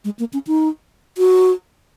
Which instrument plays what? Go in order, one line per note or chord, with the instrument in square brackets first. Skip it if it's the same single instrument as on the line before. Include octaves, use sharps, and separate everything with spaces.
[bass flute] G#3
A#3
C#4
D#4
F#4